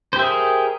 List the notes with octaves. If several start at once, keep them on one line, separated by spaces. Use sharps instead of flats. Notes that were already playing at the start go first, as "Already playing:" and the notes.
G4 G#4 A#4 C5 E5